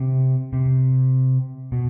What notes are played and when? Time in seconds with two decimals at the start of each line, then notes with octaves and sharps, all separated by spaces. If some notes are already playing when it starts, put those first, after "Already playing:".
Already playing: C3
0.53 C3
1.72 B2